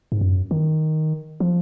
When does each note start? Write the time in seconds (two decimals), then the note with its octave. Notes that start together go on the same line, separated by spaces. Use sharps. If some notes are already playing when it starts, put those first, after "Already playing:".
0.12 G#2
0.21 F#2
0.51 D#3
1.40 F3